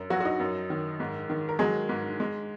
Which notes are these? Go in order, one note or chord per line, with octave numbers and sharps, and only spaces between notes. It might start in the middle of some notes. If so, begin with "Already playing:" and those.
Already playing: F#2
F#3 F#4
F#4
D#4
F#2
D#3
G#2
D#3
A#4
F#3 G#3 G#4
G#2
G#3